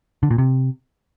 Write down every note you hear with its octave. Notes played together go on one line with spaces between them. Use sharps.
D3
A#2
C3